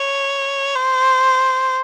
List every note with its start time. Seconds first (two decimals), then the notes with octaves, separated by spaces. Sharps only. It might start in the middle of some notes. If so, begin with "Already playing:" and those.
Already playing: C#5
0.75 C5